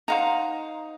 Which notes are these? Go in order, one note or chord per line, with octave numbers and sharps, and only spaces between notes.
D#4 C5 F5 F#5 A#5